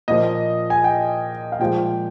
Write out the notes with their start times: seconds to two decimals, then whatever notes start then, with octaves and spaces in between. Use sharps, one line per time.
0.08 A#2 F3 A#3 D#5
0.70 G#5
0.84 G5
1.52 F5
1.59 A#2 F3 G#3 G5